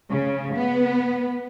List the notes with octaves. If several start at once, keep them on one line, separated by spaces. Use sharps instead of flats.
C#3
B3